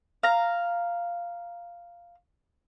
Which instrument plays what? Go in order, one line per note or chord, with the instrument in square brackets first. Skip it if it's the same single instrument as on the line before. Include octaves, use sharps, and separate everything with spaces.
[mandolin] F5 A#5